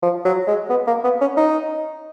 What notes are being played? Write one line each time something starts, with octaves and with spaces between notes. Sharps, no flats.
F3
F#3
G#3
B3
A#3
B3
C#4
D#4